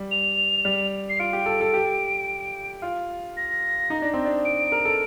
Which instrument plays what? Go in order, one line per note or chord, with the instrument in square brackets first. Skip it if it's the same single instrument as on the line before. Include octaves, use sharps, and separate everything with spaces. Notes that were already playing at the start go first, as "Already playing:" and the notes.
Already playing: [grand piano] G3
[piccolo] F7
[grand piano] G3
[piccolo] C7
[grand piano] F4 [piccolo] D7
[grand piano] G4
A4
A4
G4
F4
[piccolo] A#6
[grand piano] D#4
D4
C4
D4
[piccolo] D7
[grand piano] A#4
A4